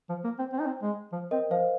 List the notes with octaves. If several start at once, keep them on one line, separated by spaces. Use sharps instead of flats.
F3
A#3
C4
C4
D#4
C4
G#3
F3
C4 A#4 D#5
F3 C5 F5